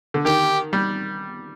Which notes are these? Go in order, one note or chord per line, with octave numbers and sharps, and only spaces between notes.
D3
D#3 G4
G3